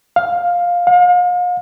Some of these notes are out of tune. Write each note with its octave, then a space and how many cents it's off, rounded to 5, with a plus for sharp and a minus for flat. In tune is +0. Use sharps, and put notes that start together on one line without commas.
F5 +10
F5 +40